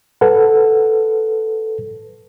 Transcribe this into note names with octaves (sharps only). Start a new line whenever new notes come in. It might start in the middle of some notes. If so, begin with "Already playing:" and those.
A4 B4 F#5